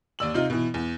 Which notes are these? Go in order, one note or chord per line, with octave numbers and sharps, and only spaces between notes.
D#2 D5 E6 F#7
C3 D#4 F4
B2 E3
E2